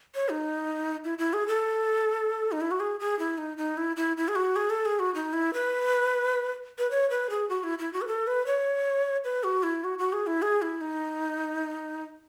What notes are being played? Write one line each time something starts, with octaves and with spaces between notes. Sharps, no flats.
C#5
D#4
E4
E4
G#4
A4
D#4
E4
F#4
G#4
G#4
E4
D#4
D#4
E4
E4
E4
G#4
F#4
G#4
A4
G#4
F#4
D#4
E4
B4
B4
C#5
B4
G#4
F#4
E4
E4
F#4
B4
A4
B4
C#5
B4
F#4
E4
F#4
F#4
G#4
E4
G#4
E4
D#4